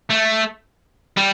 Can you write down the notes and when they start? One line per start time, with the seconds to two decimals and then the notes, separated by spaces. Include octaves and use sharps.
0.10 A3
1.17 G3